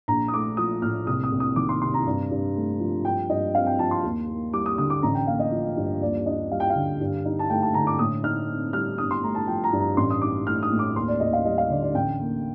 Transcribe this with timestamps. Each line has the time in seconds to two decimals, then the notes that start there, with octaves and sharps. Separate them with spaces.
0.08 A#1 A#5
0.28 D#6
0.33 A3 D6
0.57 F3 D#6
0.82 A2 F6
1.07 C2 D#6
1.23 D#6
1.32 C2
1.40 D#6
1.56 D#3 D6
1.69 C6
1.82 C3 C6
1.94 A#5
2.06 G2
2.31 G2
2.56 A3
2.80 F3
3.05 G2 G5
3.29 G2 D#5
3.54 C4 F5
3.66 G5
3.79 F3 A5
3.91 C6
4.03 D#2
4.29 A#3
4.53 G3 D6
4.66 D#6
4.78 D3 D#6
4.90 D6
5.03 A1 A#5
5.15 G5
5.27 A#3 F5
5.40 D#5
5.51 F3
5.77 G2
6.01 D#2 D5
6.26 D4 D#5
6.51 G3 F5
6.60 G5
6.70 F5
6.75 D3
7.01 G2
7.25 D#4
7.39 A5
7.50 A3 G5
7.62 A5
7.74 D3 A#5
7.87 D6
7.99 A2 D#6
8.23 D#4 F6
8.49 C4
8.73 G3 F6
8.98 G1 D#6
9.11 C6
9.23 A3 A#5
9.35 A5
9.47 F3 G5
9.64 A#5
9.73 G2
9.80 A#5
9.97 A1 C6
10.10 D#6
10.22 D#4 D6
10.46 A3 F6
10.63 D#6
10.72 A2
10.79 D6
10.96 D#2 C6
11.08 D5
11.20 D#2 D#5
11.33 F5
11.45 G3 D#5
11.58 F5
11.70 D3 D5
11.82 D5
11.94 A1 G5
12.20 A#3